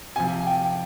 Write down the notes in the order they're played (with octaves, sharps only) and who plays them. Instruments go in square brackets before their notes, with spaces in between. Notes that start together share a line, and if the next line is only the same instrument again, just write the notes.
[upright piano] C3 F3 G#5
G5